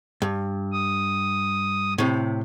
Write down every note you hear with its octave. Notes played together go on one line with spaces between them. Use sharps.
G2
D#6
A2 C3